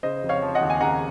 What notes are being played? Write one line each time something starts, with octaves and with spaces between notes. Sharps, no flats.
C#3 C5 D#5
F1
C#5 F5
F3
D#5 F#5
D#2
G#5
C#3 F#5 A#5